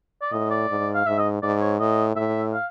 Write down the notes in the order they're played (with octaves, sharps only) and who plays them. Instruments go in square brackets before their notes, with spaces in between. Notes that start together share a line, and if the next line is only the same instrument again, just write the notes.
[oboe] D5
[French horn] A2 [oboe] D#5
[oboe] D5
[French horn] G#2
[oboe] F5
[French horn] G#2 [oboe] E5
[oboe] D#5
[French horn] G#2 [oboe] D5
[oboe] C#5
[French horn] A2 [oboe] D#5
[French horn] A2 [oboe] E5
[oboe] F5